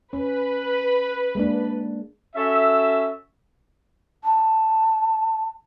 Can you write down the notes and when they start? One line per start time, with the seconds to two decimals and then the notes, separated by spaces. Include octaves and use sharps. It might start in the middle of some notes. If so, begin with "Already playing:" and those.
0.13 C#4 B4
1.35 G#3 A#3 D4
2.36 C#4 F#4 A4 E5
4.24 A5